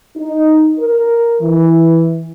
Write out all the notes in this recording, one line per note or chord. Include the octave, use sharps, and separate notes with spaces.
D#4
A#4
E3